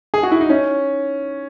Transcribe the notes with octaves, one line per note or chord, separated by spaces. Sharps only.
G#4
F#4
E4
D#4
C#4